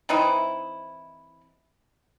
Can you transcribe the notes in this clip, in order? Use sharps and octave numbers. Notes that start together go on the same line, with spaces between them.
E3 C4 D#4 E4